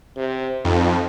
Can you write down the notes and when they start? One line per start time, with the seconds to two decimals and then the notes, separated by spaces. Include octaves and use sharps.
0.16 C3
0.65 F2 D#4